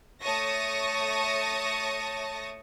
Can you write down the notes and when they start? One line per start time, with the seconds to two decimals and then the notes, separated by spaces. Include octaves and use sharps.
0.23 A3 C#5 A5 C#6 D#6 A#6